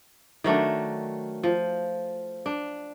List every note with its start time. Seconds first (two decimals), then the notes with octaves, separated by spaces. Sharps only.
0.44 D#3 F#3 A3 D4
1.43 F3
2.46 D4